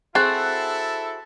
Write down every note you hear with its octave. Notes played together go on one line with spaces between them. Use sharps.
C4 E4 F#4 G#4 A4 F#6 A6 C7